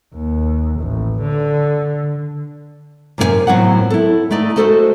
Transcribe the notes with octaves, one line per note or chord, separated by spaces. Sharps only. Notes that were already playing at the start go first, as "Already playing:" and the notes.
D#2
A1
D3
F#2 C3 A#3 E4 C#5 G#5
A2 F#3 B3 C4 F4 F#5
E4 A4
A3 D#4 D5 D#5
G#3 A3 F#4 A4 C5 D#5